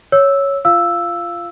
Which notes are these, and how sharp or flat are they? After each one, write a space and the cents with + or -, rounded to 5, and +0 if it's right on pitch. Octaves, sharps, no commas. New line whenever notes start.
C#5 +0 E6 -5
F4 -20 F5 -10 E6 +0